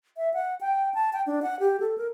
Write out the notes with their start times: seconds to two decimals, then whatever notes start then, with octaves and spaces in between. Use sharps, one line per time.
0.17 E5
0.34 F#5
0.61 G5
0.94 A5
1.13 G5
1.27 D4
1.43 F#5
1.60 G4
1.80 A4
1.98 A#4